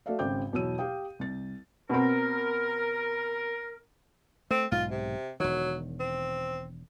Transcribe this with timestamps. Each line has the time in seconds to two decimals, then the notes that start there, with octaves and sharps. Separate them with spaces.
0.06 A3 F#4 A4 D5 E5 F5
0.19 G#1 C#3 C5 G5 D6 G6
0.53 E2 B2 F#3 C#5 E6 D#7
0.78 G4 F5 G5 D#6
1.19 C2 A6
1.90 B2 C4 A#4
4.51 A3 C4
4.72 B1 G#2 F4
4.91 C3
5.40 E1 D#3 F#3
6.00 C4